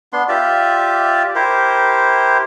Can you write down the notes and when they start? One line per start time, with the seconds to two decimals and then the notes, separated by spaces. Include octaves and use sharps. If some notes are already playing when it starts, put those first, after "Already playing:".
0.13 B3 D4 C6
0.29 F4 G4 D5 E5
1.35 E4 G4 A#4 C5